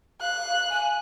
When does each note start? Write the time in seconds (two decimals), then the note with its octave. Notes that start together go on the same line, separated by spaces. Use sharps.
0.21 F5 F#6
0.69 G#5